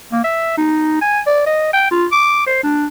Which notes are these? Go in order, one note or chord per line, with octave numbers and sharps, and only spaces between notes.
A#3
E5
D#4
G#5
D5
D#5
G5
F4
D6
C5
D4